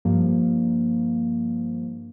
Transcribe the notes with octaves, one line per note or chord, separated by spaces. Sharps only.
G2 F3 G3 A#3